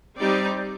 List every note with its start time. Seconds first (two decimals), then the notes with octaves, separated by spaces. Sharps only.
0.18 G3 C4 D#4 G4 D5